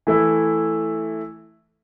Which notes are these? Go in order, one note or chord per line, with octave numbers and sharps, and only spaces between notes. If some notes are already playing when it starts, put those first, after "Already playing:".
E3 A3 E4